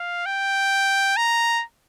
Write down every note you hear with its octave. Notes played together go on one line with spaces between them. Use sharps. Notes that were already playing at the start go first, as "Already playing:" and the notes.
Already playing: F5
G5
A#5